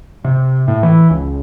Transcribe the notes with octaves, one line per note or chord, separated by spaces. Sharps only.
C3
A2
E3
C#2